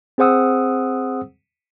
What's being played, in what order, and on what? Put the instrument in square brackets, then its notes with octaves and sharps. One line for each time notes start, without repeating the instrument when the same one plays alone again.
[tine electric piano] C4 G#4 C5 F#5 D#6 E6